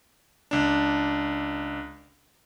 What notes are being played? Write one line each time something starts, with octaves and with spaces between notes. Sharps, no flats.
C#2 D4